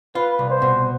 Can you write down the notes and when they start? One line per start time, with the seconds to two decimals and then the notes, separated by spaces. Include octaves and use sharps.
0.15 F4 B4
0.39 C2
0.50 C5
0.62 B2